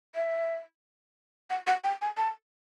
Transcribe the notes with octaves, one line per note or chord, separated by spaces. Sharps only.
E5
F#5
F#5
G5
G#5
A5